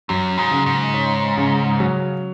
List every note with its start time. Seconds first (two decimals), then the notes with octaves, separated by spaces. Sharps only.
0.09 F#2 F#3
0.37 G#2
0.51 C#3
0.66 G#2
0.94 C#4
1.37 C#3
1.80 F#3